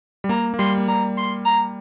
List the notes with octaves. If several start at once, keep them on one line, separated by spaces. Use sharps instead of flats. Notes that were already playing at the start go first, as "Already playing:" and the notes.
G3
A#3 A#5
A#3
G3 C6
A#3
G3 A#5
C6
A#5